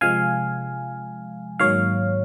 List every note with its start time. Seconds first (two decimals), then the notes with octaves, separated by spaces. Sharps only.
0.01 C3 F3 G#3 F5 G#5
1.59 G#2 D#3 F#3 A#3 C#5 F5